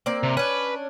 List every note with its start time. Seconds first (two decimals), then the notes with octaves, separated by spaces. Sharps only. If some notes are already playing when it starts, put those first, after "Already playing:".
0.06 A#3 C4 D5
0.23 C3
0.37 C#4 D4 B4